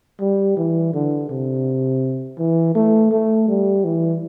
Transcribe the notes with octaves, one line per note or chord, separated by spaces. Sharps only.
G3
E3
D3
C3
E3
A3
A3
G3
E3